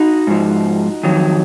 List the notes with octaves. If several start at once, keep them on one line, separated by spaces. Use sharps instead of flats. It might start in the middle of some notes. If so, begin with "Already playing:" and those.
Already playing: D#4 F#4
G#2 F3
F2 D#3 F#3